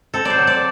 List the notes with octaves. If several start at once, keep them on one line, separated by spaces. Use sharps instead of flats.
C4 A4
C5 D5
F#3
D5